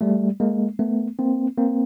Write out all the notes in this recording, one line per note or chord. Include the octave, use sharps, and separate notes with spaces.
G3 A3
G#3 A#3
A3 B3
A#3 C4
A#3 C4